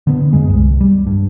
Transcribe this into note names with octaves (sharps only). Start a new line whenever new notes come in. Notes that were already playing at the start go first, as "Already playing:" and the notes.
D3 B3
F#2 G#3
C2
G3
G2